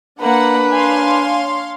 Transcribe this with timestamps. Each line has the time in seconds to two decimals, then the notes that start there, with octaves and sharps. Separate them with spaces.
0.21 A#3 D4 B4 F#5
0.72 C#5 F5 G#5 C6